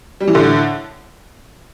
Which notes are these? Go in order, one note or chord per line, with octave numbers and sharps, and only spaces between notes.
G3
E3
A2 D3